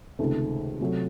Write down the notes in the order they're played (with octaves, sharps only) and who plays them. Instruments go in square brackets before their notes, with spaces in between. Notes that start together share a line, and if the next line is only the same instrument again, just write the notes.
[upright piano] C#2 C3 D#3 A3
C3 F#3 A3